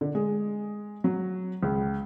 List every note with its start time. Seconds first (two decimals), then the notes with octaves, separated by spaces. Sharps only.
0.01 D3
0.15 G#3
1.04 F#3
1.63 C#2